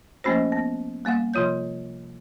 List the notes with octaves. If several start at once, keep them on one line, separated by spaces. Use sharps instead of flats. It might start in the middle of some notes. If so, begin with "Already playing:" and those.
F3 A3 A#3 C#4 F#4 C5
B3
G3 A#3 F5 F#5
C3 F3 F4 C#5 G6